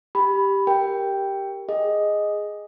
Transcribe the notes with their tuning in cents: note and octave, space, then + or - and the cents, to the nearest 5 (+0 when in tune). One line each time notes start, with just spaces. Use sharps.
G4 +0 B5 +0
G4 +0 A#4 +0 G5 +0
G#4 +0 D#5 +0